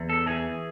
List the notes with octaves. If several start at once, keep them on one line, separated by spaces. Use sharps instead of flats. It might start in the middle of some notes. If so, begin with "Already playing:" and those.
Already playing: E2
A4
E3 G#4